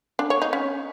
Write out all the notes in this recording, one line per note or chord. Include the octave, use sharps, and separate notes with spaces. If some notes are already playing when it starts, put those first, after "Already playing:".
D4
C#5
D#4
C#4